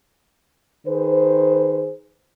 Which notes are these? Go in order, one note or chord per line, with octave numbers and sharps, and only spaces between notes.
D#3 G#4 B4 C5